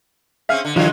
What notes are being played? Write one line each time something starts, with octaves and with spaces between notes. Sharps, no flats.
C4 C#4 G#4 E5 F5 F6
D3
D3 E3 F#3 G#3 A3 F4